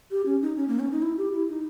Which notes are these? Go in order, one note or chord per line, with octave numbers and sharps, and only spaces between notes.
G4
C#4
D#4
C#4
A#3
C#4
D#4
E4
G4
E4
D#4